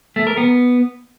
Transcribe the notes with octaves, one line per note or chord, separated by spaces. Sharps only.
A3
A#4
B3